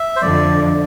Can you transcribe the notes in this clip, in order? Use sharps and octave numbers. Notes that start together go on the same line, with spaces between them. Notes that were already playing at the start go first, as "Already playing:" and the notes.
Already playing: E5
C5
F2 D3 F3 D5